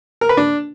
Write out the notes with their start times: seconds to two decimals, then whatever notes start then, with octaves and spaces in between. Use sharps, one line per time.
0.21 A#4
0.29 B4
0.37 D4